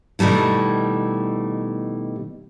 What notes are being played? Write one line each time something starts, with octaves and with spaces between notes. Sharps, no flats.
B2 D#3 G3 A3 E4